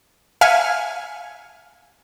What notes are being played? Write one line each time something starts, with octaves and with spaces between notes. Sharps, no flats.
E5 F5 G#5 F6 C#7